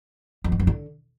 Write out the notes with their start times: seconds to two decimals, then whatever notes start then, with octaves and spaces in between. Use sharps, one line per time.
0.44 F2
0.52 G#2
0.60 F#2
0.67 D3